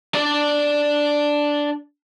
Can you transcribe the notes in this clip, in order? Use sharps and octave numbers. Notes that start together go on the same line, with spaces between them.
D4 D5